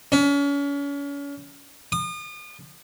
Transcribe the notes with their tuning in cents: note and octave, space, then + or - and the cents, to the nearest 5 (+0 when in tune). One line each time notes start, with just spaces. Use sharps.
C#4 +35
D#6 -40